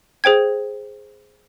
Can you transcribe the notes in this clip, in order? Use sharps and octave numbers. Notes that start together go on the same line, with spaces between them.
G#4 C5 G5 G#6